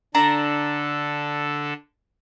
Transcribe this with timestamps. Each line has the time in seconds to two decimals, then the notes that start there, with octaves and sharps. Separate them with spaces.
0.15 D3 D4 A4 A#5